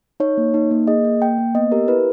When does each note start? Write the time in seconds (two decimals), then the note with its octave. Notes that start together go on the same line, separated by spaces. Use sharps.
0.20 D#4 C#5
0.37 A#3
0.54 D#4
0.71 A#3
0.88 G#4 D#5
1.04 A#3
1.21 A#3 G5
1.38 A#3
1.55 B3 D#5
1.71 G4 A#4
1.88 E4 B4